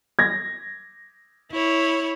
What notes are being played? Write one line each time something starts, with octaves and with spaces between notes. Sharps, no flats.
G#6 A#6
E4 C#5